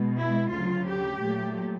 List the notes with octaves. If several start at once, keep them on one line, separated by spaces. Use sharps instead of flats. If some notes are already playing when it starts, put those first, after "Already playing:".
Already playing: B2 G#3
E4
D2 C#3 F#3 F4
G4
A#2 F#3 A3